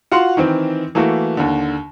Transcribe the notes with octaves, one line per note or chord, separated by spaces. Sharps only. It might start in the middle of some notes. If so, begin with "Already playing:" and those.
F4 F#4 F#5 C6
D#3 E3 C4
E3 A3 A#3 F#4
D#2 D3